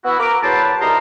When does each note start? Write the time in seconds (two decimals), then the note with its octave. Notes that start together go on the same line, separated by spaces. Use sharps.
0.05 B3 E4 F#4
0.19 A#4 D6
0.43 E2 F#3 B4 C5 A5
0.81 C2 C3 D#4 A#4 A#5 C6